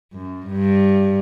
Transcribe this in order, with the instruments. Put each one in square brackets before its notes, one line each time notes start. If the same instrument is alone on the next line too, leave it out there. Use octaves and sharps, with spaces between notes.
[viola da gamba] F#2
G2